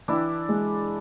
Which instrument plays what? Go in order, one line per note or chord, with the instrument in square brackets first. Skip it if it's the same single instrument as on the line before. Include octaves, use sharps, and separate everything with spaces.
[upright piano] E3 [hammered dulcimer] D4 E4
[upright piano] G#3